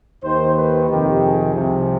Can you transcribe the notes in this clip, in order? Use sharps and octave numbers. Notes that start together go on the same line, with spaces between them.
D#2 D#3 C5
B4
F2 C3 D#3 G4
G#4
C2 C3 F3